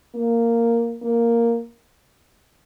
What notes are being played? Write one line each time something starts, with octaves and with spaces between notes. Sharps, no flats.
A#3
A#3